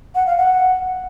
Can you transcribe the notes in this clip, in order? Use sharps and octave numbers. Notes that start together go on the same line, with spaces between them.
F#5
F5
F#5